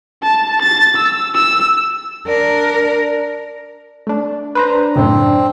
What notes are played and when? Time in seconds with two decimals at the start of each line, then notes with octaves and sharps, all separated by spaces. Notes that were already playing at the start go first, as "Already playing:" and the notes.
0.23 A5
0.62 A6
0.97 E6
1.35 E6
2.27 D4 A#4
4.07 A3 D4
4.55 D4 B4 C5 A#5
4.96 F#2 A2 C#3 C4